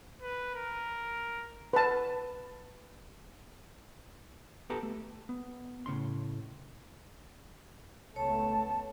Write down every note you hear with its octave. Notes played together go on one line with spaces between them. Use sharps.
B4
A#4
B4 A5
B3 F4 G4 A4 B4 A#5
A3
B3
A2 C#3 C#4 C6
C#2 A3 B3 C#5 A5